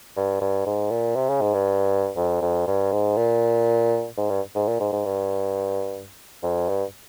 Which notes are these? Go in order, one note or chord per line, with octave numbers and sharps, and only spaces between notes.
G2
G2
G#2
A#2
C3
C#3
G#2
G2
F2
F2
G2
G#2
A#2
G#2
G2
G#2
A#2
G#2
G#2
G2
F2
G2